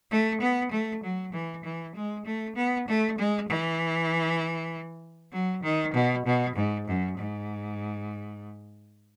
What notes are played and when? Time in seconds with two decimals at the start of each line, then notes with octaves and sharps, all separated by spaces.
0.11 A3
0.41 B3
0.71 A3
1.03 F#3
1.33 E3
1.64 E3
1.95 G#3
2.25 A3
2.56 B3
2.88 A3
3.18 G#3
3.48 E3
5.32 F#3
5.63 D#3
5.94 B2
6.25 B2
6.56 G#2
6.87 F#2
7.18 G#2